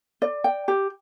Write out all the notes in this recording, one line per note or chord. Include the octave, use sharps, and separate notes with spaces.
D5
G5
G4